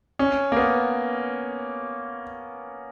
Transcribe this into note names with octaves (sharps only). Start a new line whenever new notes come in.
C#4
A#3
B3